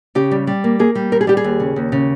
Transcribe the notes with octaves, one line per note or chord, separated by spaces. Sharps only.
C#3 G4
G3
G3
A#3
A#3 G#4
G3
D#2 A#4
G#4
G3 G4
G#4
D#2
C#3
D#2
C#3